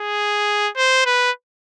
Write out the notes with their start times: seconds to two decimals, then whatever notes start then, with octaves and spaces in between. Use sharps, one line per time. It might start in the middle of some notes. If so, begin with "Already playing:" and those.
Already playing: G#4
0.77 C5
1.06 B4